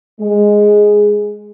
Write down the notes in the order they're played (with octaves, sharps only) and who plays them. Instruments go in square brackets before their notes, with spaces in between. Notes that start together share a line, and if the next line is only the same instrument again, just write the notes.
[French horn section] G#3